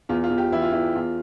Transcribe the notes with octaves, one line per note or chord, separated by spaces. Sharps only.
E2 F4
F4
E2
G4
E3 E4
F4
E2 E4
E2 F4